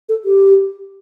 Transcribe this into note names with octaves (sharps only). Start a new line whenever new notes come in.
A4
G4